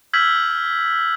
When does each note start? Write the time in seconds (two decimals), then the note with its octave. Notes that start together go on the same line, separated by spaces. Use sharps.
0.13 E6 F6 G6 G#6 B6 F#7